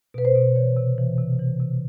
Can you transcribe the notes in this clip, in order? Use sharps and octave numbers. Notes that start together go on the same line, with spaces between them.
B2 B4
C5
B2
E3 C#5
C3
E3
C3
E3
C3